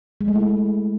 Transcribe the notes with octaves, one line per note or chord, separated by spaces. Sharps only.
G#3
A3
E4